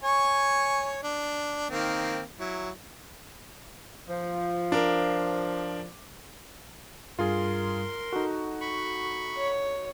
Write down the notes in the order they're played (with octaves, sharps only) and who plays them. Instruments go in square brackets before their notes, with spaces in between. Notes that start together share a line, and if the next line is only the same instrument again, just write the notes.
[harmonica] C#5 G#5 C#6
D4
D#3 A#3 C4
F#3 E4
[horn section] F3
[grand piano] D4 A#4
[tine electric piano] G2 G3 [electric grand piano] F4 G#4 [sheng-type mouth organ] A#4 C6
[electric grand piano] D#4 F#4 [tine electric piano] A4
[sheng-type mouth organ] B5 C#6
[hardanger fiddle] C#5